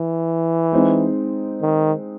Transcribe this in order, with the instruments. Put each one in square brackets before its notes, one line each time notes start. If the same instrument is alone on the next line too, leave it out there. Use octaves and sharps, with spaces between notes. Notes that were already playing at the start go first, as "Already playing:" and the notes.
Already playing: [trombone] E3
[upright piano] G#3 C4 D#4
[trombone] D#3